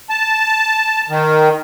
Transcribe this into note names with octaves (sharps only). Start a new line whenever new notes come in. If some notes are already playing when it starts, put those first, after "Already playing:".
A5
D#3